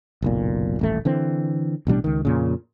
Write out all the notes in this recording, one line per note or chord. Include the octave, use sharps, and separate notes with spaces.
F#1 B1 A#2
D#1 A1 A3
D3 E3 C4
A1 B2 G3 D4
C#2 D#3
F2 A#2 C#3